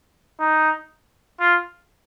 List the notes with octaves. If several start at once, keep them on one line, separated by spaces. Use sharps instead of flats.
D#4
F4